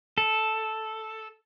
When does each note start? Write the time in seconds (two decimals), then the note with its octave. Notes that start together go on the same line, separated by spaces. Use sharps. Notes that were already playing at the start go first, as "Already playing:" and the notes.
0.18 A4